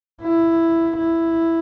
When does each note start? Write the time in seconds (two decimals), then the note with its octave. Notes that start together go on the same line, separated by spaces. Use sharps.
0.22 E4
0.97 E4